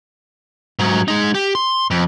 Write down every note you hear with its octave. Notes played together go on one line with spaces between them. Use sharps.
G#2 F#3
G#3 D#4
G4
C6
F2